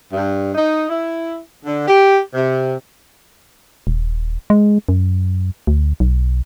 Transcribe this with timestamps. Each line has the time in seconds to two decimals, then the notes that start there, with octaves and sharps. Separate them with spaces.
0.13 G2
0.54 D#4
0.88 E4
1.64 D3
1.86 G4
2.33 C3
3.87 D#1
4.50 G#3
4.89 F#2
5.67 D2
6.00 B1